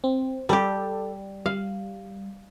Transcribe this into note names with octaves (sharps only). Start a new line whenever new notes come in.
C4
G3 G4 A4 D5
G3 F5